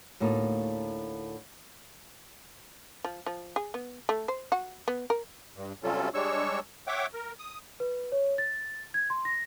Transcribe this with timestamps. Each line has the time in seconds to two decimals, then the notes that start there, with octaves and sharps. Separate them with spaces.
0.20 D2 A2 A#3 D#4
3.04 F3
3.26 F3
3.56 G#4
3.74 B3
4.09 A3
4.28 C5
4.52 F#4
4.88 B3
5.10 A#4
5.56 G2
5.84 C3 F#3 G3 C#4 F4 A4
6.14 G3 G#3 D4 C#5 C#6 E6
6.87 C#5 E5 F#5 G5 D6
7.14 A#4
7.39 D#6
7.80 B4
8.12 C#5
8.38 A6
8.94 G#6
9.10 C6
9.25 A#6